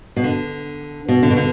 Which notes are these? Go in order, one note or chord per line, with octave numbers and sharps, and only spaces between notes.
B2
D3
B2
D3
B2
D3